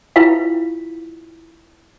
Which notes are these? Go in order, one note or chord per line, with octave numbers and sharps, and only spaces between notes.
E4 F4 B4 F5